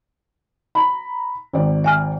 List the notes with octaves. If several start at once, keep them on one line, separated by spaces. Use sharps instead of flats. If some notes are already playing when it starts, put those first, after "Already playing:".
A#5 B5
G#1 D5
E5 G#5 F6